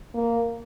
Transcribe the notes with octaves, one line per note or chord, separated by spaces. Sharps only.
A#3